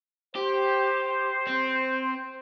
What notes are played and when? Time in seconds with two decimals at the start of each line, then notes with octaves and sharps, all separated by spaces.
0.36 G4 C5
1.47 C4